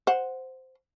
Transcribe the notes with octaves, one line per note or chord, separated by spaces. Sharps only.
C5 F#5